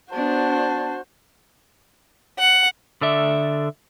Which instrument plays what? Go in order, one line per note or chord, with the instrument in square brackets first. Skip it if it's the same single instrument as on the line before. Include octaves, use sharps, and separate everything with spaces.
[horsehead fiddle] B3 D4 [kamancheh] F#4 C5 [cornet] A5
[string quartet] F#5
[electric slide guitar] D3 A4 D5 E5